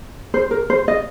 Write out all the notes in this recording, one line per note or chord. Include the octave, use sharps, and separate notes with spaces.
C5
A#4
C5
D#5